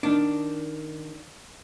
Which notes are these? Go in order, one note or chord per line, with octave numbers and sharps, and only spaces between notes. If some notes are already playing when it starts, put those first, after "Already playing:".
D#3 D4